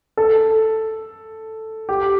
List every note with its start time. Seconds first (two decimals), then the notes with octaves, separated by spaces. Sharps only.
0.17 A4
1.89 G4